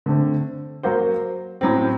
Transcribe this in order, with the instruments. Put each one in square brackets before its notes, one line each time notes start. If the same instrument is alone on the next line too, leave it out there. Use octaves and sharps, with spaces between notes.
[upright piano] D3 A3 C4
F#3 A#3 F#4 C5
A2 F#3 C4